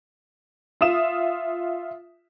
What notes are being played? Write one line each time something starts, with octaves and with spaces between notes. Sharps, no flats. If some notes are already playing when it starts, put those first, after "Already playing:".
F4 E5 D#6 E7